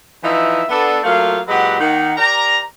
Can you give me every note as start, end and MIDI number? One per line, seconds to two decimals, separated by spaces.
0.24 0.63 52
0.24 0.63 53
0.24 0.63 63
0.24 0.63 71
0.24 0.63 76
0.69 0.98 59
0.69 0.98 62
0.69 0.98 69
1.04 1.39 54
1.04 1.39 57
1.04 1.39 58
1.04 1.39 65
1.04 1.39 77
1.48 1.78 46
1.48 1.78 54
1.48 1.78 56
1.48 1.78 67
1.48 1.78 71
1.48 1.78 78
1.80 2.12 51
1.80 2.12 58
1.80 2.12 78
2.17 2.59 67
2.17 2.59 70
2.17 2.59 74
2.17 2.59 82